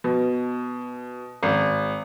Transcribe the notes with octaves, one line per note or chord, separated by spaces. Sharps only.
B2
G#1